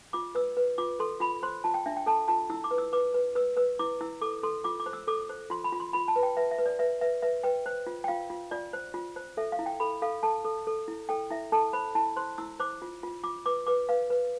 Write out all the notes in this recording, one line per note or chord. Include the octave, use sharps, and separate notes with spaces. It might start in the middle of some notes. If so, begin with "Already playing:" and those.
F4 D6
B4 E6
B4
F4 D6
A4 C6
F4 B5
C5 C6
F4 A5
G5
D4 E5
G5
A4 A5
F4 A5
E4 E6
D6
B4
E6
B4 D6
B4
B4 E6
B4 E6
E4 D6
E4 E6
A4 D6
A4 C6
F4 D6
D6
C5
E6
A4 D6
C5
F4 C6
B5
F4
C6
F4 B5
A5
B4
G5
B4 E5
E5
B4
D5
B4 E5
B4 E5
B4 E5
B4 G5
C5
F4
G5
F4 F5
F4
F4 D5
C5
F4
C5
A4 E5
F5
E4
G5
A4 B5
A4 F5
A4 A5
A4
A4
E4
A4 G5
E4 E5
A4 A5
C5 B5
E4 A5
C5 C6
E4 E6
C5 D6
F4
F4
F4 D6
B4 D6
B4 D6
B4 F5
B4